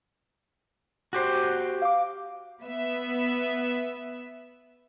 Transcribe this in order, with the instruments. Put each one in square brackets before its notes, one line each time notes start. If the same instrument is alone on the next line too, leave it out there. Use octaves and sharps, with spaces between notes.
[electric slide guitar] F#4 G4 C5
[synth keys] F5 D6
[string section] B3 B4 E5